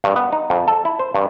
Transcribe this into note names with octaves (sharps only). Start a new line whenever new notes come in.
G2
B3
D#4
F2
A4
E4
C5
G2